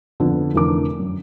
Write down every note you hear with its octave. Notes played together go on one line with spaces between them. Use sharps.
F2 D3 B3
F1 D3 E3 D4 A#4 D6
F#2